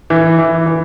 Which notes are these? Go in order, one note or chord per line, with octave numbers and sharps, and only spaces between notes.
E3
E3
E3